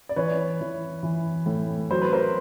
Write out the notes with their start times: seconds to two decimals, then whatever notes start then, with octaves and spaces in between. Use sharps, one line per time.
0.09 D5
0.16 E3 B4 C#5
0.60 E3
1.03 E3
1.46 A2
1.91 F#3 C5
2.02 B4
2.13 A#4 C5